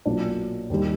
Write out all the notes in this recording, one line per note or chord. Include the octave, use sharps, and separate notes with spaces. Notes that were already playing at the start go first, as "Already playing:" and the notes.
B1 A#2 F#3 A#3 D4
D#2 D#3 G3